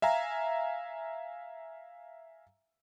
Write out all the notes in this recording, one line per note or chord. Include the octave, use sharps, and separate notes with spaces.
E5 F5 G#5 A#5